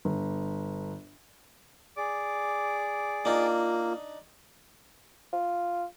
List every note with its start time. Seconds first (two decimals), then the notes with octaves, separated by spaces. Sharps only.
0.05 G1
1.97 G#4 D5 D6
3.25 A#3 D4 D#4 F4
5.33 F4